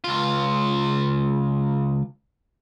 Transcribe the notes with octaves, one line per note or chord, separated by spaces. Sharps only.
C#2 F4